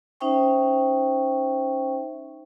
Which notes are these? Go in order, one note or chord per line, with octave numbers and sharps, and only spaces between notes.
C#4 D#4 C5 E5 G5 C#6